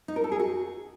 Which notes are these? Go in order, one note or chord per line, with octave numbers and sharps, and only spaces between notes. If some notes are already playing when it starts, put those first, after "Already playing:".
D#4
A#4
A4
G#4
F#4